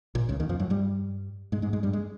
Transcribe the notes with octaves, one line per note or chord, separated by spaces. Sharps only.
A#1 A#2
C#2 C#3
D#2 D#3
F2 F3
F#2 F#3
G2 G3
G#2 G#3
G#2 G#3
G#2 G#3
G2 G3
G#3